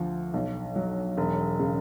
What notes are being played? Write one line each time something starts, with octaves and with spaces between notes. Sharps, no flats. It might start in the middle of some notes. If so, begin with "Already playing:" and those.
Already playing: D2 F3
B1
F#3
E1
C#3